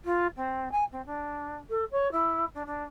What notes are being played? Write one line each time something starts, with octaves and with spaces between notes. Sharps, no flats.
F4
C4
G#5
C4
D4
A4
C#5
E4
D4
D4